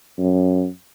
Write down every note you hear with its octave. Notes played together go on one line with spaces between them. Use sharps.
F#2